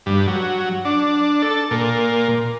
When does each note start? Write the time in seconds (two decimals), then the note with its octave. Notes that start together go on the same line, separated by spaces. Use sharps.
0.06 G2
0.28 F#3
0.85 D4
1.42 A4
1.71 A#2